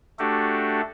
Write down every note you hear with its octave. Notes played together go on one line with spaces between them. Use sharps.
A3 D4 F#4 G4 A4